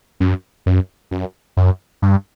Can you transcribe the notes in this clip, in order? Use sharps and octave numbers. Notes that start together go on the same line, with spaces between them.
F#2
F#2
F#2
F#2
G2